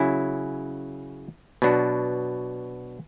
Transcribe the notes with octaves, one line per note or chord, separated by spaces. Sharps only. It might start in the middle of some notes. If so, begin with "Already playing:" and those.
Already playing: C#3 F#3 C#4 E4
B2 F#3 B3 D4 F#4